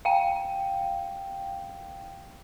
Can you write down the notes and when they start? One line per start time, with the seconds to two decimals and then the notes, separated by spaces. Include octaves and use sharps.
0.05 F5 G5